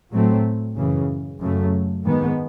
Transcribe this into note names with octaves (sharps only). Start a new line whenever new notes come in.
A2 F#3 A3 C4
F#2 C#3 E3
F#2 C#3 F#3 A3
G#2 D#3 G#3 B3